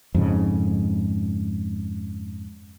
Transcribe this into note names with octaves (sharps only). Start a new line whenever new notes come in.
F2 G#2 C#3